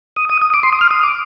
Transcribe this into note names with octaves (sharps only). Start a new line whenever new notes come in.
D#6
D#6
D#6
D6
C6
D#6
F6
D#6
D6